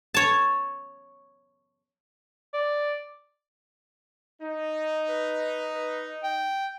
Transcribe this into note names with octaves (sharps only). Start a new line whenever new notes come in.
C#5 A5
D5
D#4
B4
B4
G5